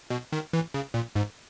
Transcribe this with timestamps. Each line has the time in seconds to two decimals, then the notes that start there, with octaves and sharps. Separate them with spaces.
0.10 B2
0.32 D#3
0.53 E3
0.74 C#3
0.94 A#2
1.16 G#2